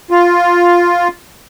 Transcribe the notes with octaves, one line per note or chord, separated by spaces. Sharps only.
F4